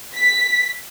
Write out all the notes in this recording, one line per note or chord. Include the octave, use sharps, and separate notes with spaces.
B6